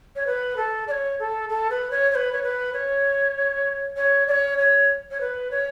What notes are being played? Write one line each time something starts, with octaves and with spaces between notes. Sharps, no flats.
C#5
B4
A4
D5
C#5
A4
A4
B4
C#5
C#5
B4
C#5
B4
C#5
C#5
D5
C#5
C#5
C#5
B4
C#5